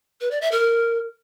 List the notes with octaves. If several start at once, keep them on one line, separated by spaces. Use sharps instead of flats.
B4
D5
E5
A#4